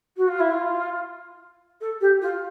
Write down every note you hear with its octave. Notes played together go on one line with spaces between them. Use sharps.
F#4
F4
E4
F4
A4
G4
F4